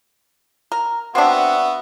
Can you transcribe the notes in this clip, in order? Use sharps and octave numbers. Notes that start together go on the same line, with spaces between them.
A#4
B3 C4 D4 F#4 E5